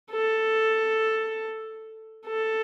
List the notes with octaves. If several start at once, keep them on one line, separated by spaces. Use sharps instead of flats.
A4
A4